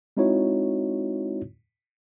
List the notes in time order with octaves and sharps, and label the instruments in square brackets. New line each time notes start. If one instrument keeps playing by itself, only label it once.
[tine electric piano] G#3 C4 D#4 E4 F#4 C#5